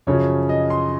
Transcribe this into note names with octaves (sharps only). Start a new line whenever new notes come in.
F#2 C#3 F3 C#5
D#5
C6